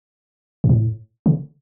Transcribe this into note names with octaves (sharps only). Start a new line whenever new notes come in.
G2
A2
C#3